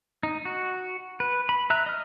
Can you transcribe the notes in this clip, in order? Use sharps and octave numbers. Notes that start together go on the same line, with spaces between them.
D#4
F#4
B4
B5
E5 A#5 F#6
D#5 F6